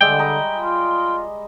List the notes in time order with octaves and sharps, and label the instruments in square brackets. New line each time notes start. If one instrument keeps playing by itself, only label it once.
[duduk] D3 [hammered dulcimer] G3 G#3 E5 [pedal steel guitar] G5
[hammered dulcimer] D#5 A#5 B5
[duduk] F4